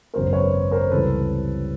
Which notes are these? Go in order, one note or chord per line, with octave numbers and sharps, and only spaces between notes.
G#1 F#2 C#3 F#3 B3 A#4 C5
B4 C#5
A#4 C5
C#2 C3 E3 G3 A4 B4